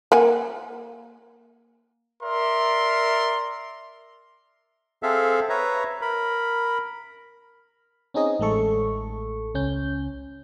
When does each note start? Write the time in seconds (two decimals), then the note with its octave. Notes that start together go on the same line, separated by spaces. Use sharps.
0.12 A#3 F#5 G#5
2.24 A#4 D5 E5 C6
5.03 C4 G#4 A4 E5 F5
5.50 B4 C#5 E5 A#5
6.02 A#4 B5
8.14 C4 C#4 D#4 G#4 D#5
8.40 A1 G#3 A3 A4 C#6
9.54 C#2 C#4 G6